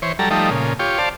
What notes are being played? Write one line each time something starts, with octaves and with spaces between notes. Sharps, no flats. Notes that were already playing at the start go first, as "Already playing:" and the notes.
E3 C5 C#5
F#3 G3 A4 A#5
F3 G3 A3 D#4
A#2 C#3
F4 G4 C#5
C5 D5 F5 A5